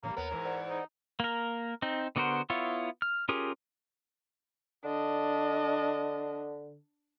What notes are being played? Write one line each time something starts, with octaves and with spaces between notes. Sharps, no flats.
A2 C#3 E3 G3 A#3
D#2 B3 A#4 C#5 A#5
G#2 E3
C5 D5 F#5
D#4
A#3 A#4
C4 D#4
D3 B3 F#4 A#4 C5
B3 E4 F4 C#5
F6
C#4 F4 G4 G#4 A#4
D3 D4 D#5